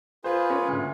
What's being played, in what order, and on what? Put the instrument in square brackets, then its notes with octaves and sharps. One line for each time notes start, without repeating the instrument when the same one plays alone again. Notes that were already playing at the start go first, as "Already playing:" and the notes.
[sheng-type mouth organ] F4 G#4 B4 [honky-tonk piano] C5
[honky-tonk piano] C#4
D2 A#2